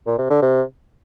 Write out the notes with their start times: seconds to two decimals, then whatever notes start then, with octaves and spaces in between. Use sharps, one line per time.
0.06 A#2
0.18 C3
0.30 D3
0.42 C3